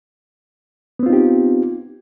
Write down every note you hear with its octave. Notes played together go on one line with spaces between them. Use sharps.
B3 C4 D#4 F4 G4